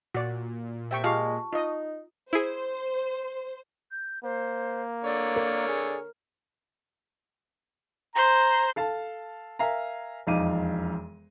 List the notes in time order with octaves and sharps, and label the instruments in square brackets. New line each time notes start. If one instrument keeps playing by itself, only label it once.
[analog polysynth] A#2 [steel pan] F#4 D5
[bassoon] C3 [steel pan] E5 G5 C#6
[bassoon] G#3 [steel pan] F4 G4 F5 [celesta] A5 C#6
[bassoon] D#4 [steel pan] F4 D#5
[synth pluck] E4 G#4 [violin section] C5
[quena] G6
[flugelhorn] A#3 [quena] C5
[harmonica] D3 C#5 [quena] D5
[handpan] A#4
[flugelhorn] G#4
[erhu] C5 [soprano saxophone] A#5
[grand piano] A4 F5 A5
A#4 E5 F5 G#5 A#5
E1 F2 D#4 F5 D6 D#7